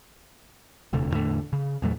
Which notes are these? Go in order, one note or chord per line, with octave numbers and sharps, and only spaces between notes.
E1 D2 C3 A3
E2 A2 D3 A3
C#3
E2 A#2 F#3 A3